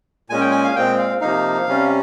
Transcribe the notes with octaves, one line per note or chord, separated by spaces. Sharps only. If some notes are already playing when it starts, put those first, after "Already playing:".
A#2 G#3 C#4 G#5
G5
G#5
F5
A#2 G#3 C4 G5
F5
C3 F3 A#3 D#4 F5
C3 G3 C#4